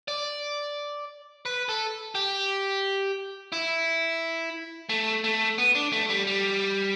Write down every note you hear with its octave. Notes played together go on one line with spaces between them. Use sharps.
D5
B4
A4
G4
E4
A3
A3
B3
D4
A3
G3
G3